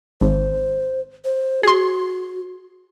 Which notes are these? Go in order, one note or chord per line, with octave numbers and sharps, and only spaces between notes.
G#1 C5
C5
F#4 G#4 C6